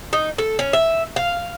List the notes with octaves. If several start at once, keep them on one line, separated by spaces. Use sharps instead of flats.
D#4
A4
C#4
E5
F5